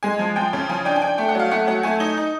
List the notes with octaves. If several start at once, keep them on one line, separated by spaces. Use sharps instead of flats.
G#3 G#5
F3
F3 G5
C#3
F3 G#5
D4 G5
G#5
D4 G5
A3 G5
F#5
F#3 F5
A3 F#5
F#3 F#5
A3 G#5
D#4 D#5
D#4